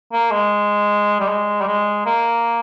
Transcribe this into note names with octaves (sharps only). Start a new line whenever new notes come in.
A#3
G#3
G3
G#3
G3
G#3
A#3